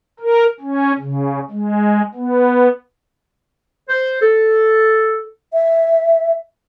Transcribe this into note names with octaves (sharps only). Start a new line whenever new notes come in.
A#4
C#4
C#3
G#3
B3
C5
A4
E5